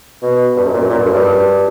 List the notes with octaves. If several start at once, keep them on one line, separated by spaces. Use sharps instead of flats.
B2
G2
F#2
A#2
F#2
A#2
G2
F#2
G2